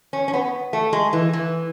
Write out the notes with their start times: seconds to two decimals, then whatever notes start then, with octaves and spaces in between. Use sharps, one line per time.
0.13 C#4
0.28 C#4
0.33 B3
0.73 A3
0.93 G#3
1.13 E3
1.33 E3